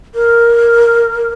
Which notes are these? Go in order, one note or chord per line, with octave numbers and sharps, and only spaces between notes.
A#4